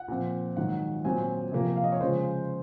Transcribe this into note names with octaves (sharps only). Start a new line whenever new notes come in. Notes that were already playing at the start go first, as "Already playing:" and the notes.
Already playing: F#5
A#2 F3 C4
G#2 D#3 F#3 F#5
A#2 F#3 C4 G#5
C3 F3 A#3
F5
D#5
C#5
C#3 F3 G#3 C5